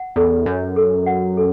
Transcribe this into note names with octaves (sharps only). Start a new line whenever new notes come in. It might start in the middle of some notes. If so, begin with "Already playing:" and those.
Already playing: F#5
E2 A4
F#2 C#5
A4
F#5
A4